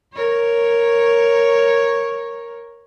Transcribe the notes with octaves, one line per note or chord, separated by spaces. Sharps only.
A#4 C#5